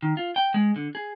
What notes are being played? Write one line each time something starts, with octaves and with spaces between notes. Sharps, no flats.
D#3
F4
G5
G#3
D3
G#4